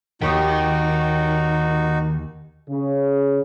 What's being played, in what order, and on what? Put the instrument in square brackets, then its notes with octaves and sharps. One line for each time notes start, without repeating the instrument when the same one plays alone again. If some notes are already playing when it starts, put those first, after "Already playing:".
[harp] D#2 D#6 [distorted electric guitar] D#3 [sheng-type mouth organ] D#4 F#4 [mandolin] G4 C#5 G5
[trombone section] C#3